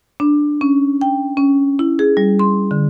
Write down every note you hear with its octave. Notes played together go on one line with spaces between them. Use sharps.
D4
C#4
G5
C#4
E4
G#4
G3
C6
D3